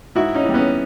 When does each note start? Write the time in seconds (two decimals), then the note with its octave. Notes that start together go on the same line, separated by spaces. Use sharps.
0.15 G#2 E4 F#4
0.35 C#4 D#4
0.45 E3 G3
0.54 B3 C#4